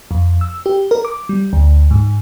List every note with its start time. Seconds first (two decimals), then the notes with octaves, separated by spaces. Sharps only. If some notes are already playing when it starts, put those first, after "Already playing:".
0.11 F2
0.41 E6
0.66 G4
0.91 A#4
1.05 D6
1.29 G3
1.53 D2
1.91 G#2